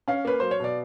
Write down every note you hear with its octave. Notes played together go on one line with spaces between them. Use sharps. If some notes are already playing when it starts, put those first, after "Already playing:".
C#4 F5
A#3 B4
F#3 C5
C#5
B2 D5